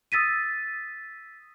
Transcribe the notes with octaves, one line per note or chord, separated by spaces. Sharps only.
D#6 E6 A6 B6 D#7